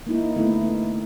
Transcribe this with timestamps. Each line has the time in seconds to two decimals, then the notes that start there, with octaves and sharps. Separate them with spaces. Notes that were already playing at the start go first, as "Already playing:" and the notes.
0.07 A#3 D#4 E4
0.36 D3 A3 B3 E4